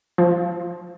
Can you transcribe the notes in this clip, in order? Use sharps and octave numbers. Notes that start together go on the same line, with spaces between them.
F3